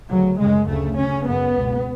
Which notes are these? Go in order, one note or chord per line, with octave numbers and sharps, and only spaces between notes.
D2 C#3 F#3
F#2 C#3 G#3
D2 C#3 A3
D2 C#3 C#4
F#2 C#3 B3
C#2 B2